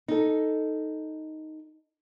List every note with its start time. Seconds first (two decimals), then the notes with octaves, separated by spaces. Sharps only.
0.08 D#4 A4